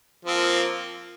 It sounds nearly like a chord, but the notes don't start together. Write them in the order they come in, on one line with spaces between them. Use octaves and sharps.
F3 C4 A#3